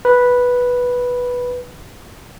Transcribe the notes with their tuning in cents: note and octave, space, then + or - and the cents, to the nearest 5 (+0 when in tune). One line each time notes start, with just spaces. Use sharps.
B4 -5